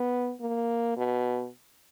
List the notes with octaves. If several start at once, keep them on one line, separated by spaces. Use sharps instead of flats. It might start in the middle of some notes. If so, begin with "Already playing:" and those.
Already playing: B3
A#3
B2